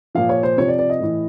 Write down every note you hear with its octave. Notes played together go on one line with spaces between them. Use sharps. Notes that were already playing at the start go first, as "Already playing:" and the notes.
A#2 F3 F5
C#5
C5
C3 F3 C#5
D5
D5
D#5
A2 E3